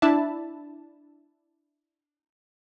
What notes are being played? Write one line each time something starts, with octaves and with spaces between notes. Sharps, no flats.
D4 E4 E5 A5 B5